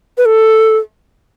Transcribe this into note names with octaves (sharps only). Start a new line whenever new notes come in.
B4
A4